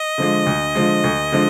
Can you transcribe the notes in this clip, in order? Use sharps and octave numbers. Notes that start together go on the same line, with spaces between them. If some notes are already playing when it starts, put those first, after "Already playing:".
Already playing: D#5
D3 F3 G#3
D2
D3 F3 G#3
D2
D3 F3 G#3